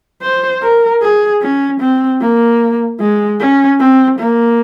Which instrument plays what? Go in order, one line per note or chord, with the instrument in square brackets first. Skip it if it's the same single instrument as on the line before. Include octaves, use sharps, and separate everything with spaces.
[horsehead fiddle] C5
A#4
G#4
C#4
C4
A#3
G#3
C#4
C4
A#3